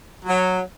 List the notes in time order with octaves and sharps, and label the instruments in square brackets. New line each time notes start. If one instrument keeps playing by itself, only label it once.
[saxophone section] F#3